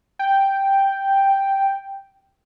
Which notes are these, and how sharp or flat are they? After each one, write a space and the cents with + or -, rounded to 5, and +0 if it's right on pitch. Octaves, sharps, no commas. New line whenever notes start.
G5 +0